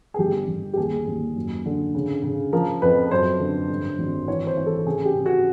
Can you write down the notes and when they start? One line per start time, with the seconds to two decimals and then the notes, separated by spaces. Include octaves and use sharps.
0.14 G#4
0.19 G1 G4
0.48 G1
0.73 G4
0.77 D#2 G#4
1.07 D#2
1.36 F#2
1.66 D3
1.94 C#3
2.23 C#3
2.53 F3 A#4
2.82 F2 B4
3.11 F#2 C5
3.40 D3
3.70 G2
3.99 G#1
4.28 E3 C#5
4.47 C5
4.57 E3
4.66 A4
4.86 C#3 G#4
5.05 G4
5.15 C#3
5.26 F#4